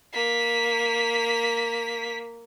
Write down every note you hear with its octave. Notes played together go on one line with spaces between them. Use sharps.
A#3 B6